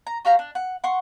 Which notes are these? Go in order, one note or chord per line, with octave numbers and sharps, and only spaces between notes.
A#5
F#4 G4 F5 A#5
D4
F#5
F#5 C6 C#6